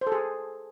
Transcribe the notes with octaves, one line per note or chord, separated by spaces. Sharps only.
C5
A4
G#4